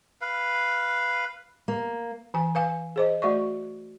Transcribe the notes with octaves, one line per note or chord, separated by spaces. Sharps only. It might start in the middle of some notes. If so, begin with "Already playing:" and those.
B4 F5
A#3
E3 G#5
B4 F5 G#5
G#4 C5 D#5
A3 F#4 D5 E5 C#6